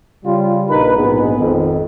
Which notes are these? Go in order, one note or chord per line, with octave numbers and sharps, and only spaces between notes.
C#3 G3 F4
A#1 D#4 A#4 B4
A#1 G#2 B2 G#3 B3 G#4
G#1 F2 D#3